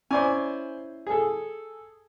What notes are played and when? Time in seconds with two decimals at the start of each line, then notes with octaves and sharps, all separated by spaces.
0.11 C#4 E4 C5 D5 G#5
1.07 G#4 A4